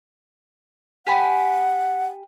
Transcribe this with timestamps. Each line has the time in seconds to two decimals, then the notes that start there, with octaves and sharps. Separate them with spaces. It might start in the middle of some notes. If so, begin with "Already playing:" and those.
1.07 G4 F#5 G#5 B5